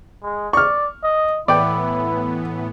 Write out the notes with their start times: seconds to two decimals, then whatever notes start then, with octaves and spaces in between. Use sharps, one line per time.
0.23 G#3
0.53 D5 C#6 F6
1.04 D#5
1.48 A2 E3 B3 E4 D5 G5